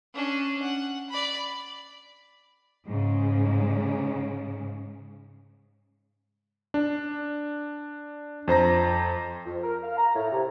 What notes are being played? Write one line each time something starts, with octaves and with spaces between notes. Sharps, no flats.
C#4 D4
F#5
D5 B5
G#2 C#3
D4
F2 C5 A#5 A#6
F2
A#4
F5
A#5
A2
C3